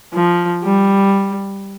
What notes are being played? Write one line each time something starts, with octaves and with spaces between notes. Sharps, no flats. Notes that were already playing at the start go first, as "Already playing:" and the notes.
F3
G3